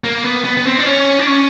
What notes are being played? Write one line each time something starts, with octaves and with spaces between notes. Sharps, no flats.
A#3
B3
B3
B3
C4
D4
C#4
D4
C#4